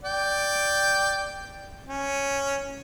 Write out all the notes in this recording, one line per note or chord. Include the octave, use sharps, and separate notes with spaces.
D5 G5
C#4